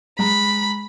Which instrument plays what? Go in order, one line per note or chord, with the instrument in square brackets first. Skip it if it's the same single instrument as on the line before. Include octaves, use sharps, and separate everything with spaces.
[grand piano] G#3 A#5 [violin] B5